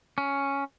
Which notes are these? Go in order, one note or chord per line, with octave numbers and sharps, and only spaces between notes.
C#4